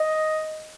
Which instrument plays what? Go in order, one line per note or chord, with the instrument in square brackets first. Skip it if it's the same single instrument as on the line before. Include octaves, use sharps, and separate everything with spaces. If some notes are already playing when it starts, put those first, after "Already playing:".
Already playing: [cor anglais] D#5